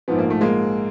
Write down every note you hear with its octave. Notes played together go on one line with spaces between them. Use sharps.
A#1 G#2 F3 B3
A#3
A3
G#3 A#3